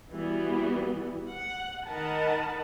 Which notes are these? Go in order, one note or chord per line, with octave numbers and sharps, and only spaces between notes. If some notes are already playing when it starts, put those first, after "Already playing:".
E3 G3 B3 F#4
F#5
D#3 A#4 D#5 F#5 A5 B5